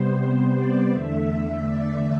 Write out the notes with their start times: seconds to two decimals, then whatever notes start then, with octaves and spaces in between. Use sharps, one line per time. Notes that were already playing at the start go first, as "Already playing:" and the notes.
Already playing: C3 G3 B3 C5
0.54 D5
0.91 E2 D3 A3 E5
1.28 E5
1.64 D5